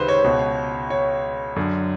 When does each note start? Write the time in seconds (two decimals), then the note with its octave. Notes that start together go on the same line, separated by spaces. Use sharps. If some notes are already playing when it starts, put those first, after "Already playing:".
Already playing: C#2 C3 D#3 B4 C5
0.08 C#5
0.24 C#2 B2
0.90 C#5
1.56 F#2 D3